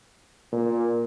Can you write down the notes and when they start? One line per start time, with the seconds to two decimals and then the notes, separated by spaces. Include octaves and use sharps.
0.52 A#2